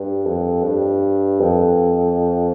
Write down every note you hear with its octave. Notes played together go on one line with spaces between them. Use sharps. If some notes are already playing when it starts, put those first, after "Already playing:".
Already playing: G2
F2
G2
F2